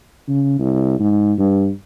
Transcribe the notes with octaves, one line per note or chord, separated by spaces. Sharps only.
C#3
C2
G#2
G2